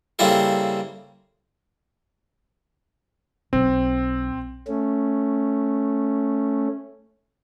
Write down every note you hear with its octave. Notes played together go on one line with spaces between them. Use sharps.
C#3 G3 A#3 C4 E4 A4
B1 C4
A3 C#4